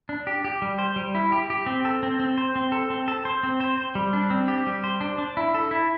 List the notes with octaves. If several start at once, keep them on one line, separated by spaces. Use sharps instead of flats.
D4
G4
G4
G3
C5
G3
E4
G4
G4
C4
A4
C4
C4
C5
C4
A4
C4
A4
C5
C4
C5
C5
G3
D4
C4
G4
G3
C5
D4
D4
E4
A4
E4